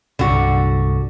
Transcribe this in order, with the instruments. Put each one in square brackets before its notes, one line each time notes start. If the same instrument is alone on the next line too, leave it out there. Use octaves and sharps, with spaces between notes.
[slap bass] C2 G2 F#3 [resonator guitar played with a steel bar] D3 F#4